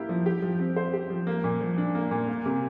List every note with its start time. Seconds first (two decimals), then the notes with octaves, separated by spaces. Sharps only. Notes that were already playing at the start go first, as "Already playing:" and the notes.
Already playing: A#3 E4 G4
0.09 F3
0.26 G4
0.42 F3
0.59 C4
0.76 C5
0.93 G4
1.10 F3
1.27 A#3
1.44 A#2
1.61 F3
1.78 D4
1.95 A#3
2.11 A#2
2.28 A#3
2.45 C3